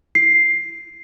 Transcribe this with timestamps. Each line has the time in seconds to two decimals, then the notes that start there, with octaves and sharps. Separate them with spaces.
0.15 C7